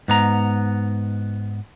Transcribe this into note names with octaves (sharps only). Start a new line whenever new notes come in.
G#2 B3 A#5